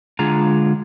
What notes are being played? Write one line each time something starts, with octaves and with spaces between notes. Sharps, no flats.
D3 G#3 D4 F4 G#4 A#5